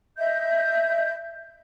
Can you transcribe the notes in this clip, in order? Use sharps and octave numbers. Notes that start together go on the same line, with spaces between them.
D#5 E5 G6